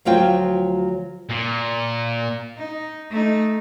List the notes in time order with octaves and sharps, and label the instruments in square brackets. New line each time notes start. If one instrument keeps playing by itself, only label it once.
[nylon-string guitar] D2 F3 F#3 F4 G5
[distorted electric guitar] A#2
[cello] D#4
A3 D#4